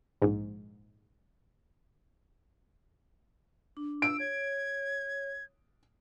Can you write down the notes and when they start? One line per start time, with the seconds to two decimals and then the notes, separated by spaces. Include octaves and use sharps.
0.22 A#1 G#2
3.77 D4
4.02 E6 D7
4.20 C#5 G#6